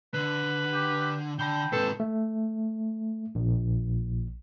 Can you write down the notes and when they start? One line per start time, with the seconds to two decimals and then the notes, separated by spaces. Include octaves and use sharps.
0.14 D3 B4
0.73 G4
1.39 D3 G5 A5 B5 G7
1.72 G#2 C3 A4 B4
2.00 A3
3.35 A#1